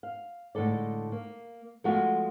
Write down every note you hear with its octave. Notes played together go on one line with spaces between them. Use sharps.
F5
A2 D3 G#3 A4 D5
A#3
F3 G#3 A3 B3 F4 F#4